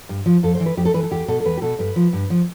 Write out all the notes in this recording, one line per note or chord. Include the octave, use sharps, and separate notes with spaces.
G2
F3
F2 A4
C5
E3
B4
F2 G4
A4
E3 B4
A4
E2 G4
B2 A4
A4
E2 B4
G4
B2 A4
G2 B4
F3
G2
F3